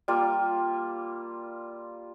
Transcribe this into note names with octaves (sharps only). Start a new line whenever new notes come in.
G3 A#3 F4